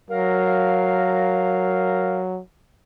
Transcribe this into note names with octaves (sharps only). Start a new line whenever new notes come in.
F#3 A#4 F5